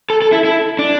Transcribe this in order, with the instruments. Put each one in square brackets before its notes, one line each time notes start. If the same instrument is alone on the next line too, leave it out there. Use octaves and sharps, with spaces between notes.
[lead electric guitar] A4
A4
E4
E4
D4